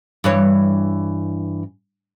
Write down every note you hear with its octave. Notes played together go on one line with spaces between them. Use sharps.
G2 E3 C#5